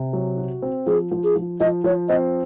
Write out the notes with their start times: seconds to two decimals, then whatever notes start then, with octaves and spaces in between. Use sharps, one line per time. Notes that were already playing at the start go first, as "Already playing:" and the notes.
Already playing: C3
0.13 F#3
0.37 F#4
0.62 C4
0.87 F3 G#4
1.11 F3
1.24 G#4
1.36 F3
1.60 F3 D#5
1.84 F3 C#5
2.09 C4 D#5